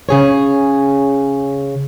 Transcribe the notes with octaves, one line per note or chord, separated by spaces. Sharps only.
C#3 G#4 C#5